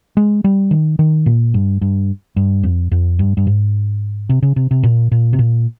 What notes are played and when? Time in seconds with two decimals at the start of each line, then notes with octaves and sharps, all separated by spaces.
0.17 G#3
0.44 G3
0.71 D#3
0.99 D#3
1.26 A#2
1.54 G2
1.81 G2
2.36 G2
2.63 F2
2.91 F2
3.19 G2
3.37 G2
3.47 G#2
4.29 C3
4.42 C#3
4.56 C3
4.71 C3
4.83 A#2
5.11 A#2
5.33 C3
5.39 A#2